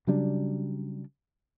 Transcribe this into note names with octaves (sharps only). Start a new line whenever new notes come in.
C#3 F#3 G3 D4